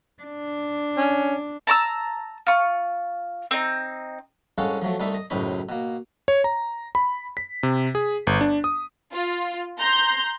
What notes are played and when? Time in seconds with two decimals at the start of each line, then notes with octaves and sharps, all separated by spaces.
0.23 D4
0.97 C#4
1.67 A5 A#5 C#6 E6
2.47 F4 C#6
3.51 C4 D#4
4.58 C2 G#3 C#4 A4 F5 F#5
4.82 F3 F#3 A3
5.00 C2 G3 A3 D#4 E5 C6
5.14 D#5
5.30 C#2 F#2 A2 D#4 C5 B5
5.69 B2 A#3
6.28 C#5
6.44 A#5
6.95 B5
7.37 B6
7.63 C3
7.95 G#4
8.27 G1
8.41 D4
8.64 D#6
9.13 F4
9.79 A#5 C6 G6